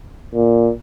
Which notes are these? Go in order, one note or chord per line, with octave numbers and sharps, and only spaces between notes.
A#2